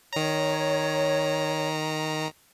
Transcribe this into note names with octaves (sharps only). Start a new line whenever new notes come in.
D#3 C#5 A#5